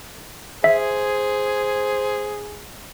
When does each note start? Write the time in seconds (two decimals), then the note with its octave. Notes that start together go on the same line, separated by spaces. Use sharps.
0.64 G#4 C5 E5